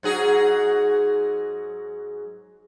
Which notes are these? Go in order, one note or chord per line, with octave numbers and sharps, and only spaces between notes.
G#2 F#3 G#4